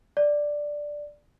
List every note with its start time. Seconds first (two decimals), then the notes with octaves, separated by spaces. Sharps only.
0.17 D5